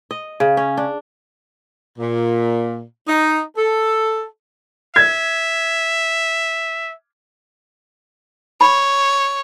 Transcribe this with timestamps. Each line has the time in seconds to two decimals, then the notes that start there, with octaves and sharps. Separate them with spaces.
0.11 D#5
0.40 C#3
0.57 C#4
0.77 D4
1.99 A#2
3.07 D#4
3.57 A4
4.96 E5 G#6
8.61 C#5 B5